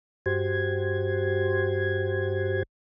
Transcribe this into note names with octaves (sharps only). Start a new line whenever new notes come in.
G2 F#4 G4 C5 G#6